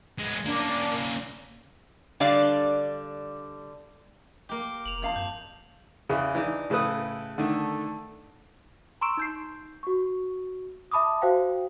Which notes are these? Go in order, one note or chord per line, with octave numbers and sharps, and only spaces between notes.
G#3 B3
A#3 C#4 D4 A#4 D5
D3 G3 D4 D5 F5
A#3 G4
F1 F7 F#7
F2 F5 A5
F#2 G6
E2 C#3
E3 D4 D#4
A2 C#3 A4 B4 D#6
D3 D#3 A3
A#5 C6 C#6 E6 D7 E7
D#4 G6 C7
F#4 C#6
E5 A5 B5 D6 D#6
F#4 C5 F5 G5